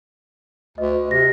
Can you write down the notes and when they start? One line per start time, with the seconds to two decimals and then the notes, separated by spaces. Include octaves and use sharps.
0.78 D2 D#5
1.11 C3 A#6